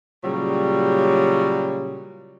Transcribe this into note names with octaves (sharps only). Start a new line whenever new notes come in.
A#2 C#3 F#3 G3